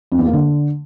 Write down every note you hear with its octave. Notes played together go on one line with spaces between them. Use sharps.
F2
E2
A#3
D3